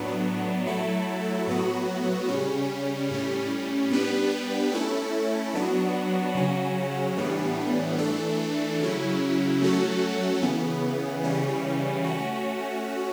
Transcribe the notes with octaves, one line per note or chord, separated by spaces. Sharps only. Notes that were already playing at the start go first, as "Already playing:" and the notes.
Already playing: A2 F#3 B3 D4
F#3 A3 E4 A4
A2 F#3 B3 F#4
C#3 G3 C#4
A2 G3 C#4
G3 B3 D4 G4 B4
A3 C#4 E4 A4
F#3 B3 D4 F#4
C#3 F#3 C#4 F#4
A2 E3 G3 B3 D4
E3 A3 D4 A4
C#3 F#3 C#4 E4
F#3 A3 C#4 F#4 A4
C#3 E3 B3
C#3 E3 G3 C#4
A3 C#4 F#4